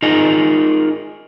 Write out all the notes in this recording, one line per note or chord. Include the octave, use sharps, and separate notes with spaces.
D#4 F4 G#4 A#4 D#5